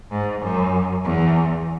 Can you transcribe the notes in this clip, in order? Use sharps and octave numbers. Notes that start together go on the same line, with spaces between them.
G#2
F#2
E2